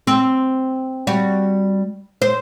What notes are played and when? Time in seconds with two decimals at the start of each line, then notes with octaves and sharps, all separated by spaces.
0.07 C4
1.07 G3 F#4
2.22 C5